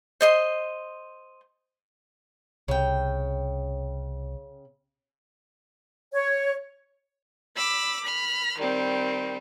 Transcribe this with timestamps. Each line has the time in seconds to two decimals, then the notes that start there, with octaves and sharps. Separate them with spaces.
0.21 C5 D#5 C6
2.68 C2 C#3 G5
6.14 C#5
7.56 B5 D6 E6
8.03 B5 F6
8.57 D#3 G3 C4